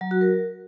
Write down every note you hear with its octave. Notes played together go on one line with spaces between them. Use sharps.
F#3
F#4
A#4